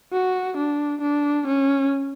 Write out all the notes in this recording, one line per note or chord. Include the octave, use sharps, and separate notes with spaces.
F#4
D4
D4
C#4